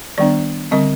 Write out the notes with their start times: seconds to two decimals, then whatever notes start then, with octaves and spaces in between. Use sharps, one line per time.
0.18 D#3 G3 B3 D4 D5
0.71 D3 G3 C4 D#5